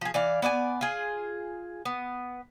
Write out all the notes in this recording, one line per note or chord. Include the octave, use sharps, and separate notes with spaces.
F3 G#4
E3 D5 F5
B3 D5 D#5 G#5
F4 G#4
B3